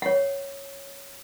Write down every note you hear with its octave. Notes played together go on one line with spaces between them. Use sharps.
C#5 F#5